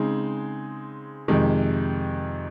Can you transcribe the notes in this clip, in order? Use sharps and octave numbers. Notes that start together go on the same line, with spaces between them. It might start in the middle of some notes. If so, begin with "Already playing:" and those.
Already playing: C#3 G#3 C4 D#4
F2 C3 D#3 G#3